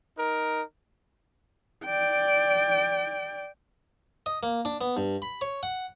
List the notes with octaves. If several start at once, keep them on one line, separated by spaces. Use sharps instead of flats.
D#4 A#4
D5 G5
D#5
A#3
D4
B3
G2
B5
C#5
F#5